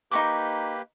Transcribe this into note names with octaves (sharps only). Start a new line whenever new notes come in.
A#3 D#4 G4 B4 C#6 D6